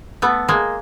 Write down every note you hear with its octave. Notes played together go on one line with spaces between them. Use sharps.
A3 B3
G#3 A#3